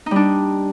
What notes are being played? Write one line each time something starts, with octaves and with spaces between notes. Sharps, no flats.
G3 D4 D#4